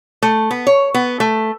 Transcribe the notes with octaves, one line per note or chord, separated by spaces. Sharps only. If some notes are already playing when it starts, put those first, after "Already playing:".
A3
B3
C#5
B3
A3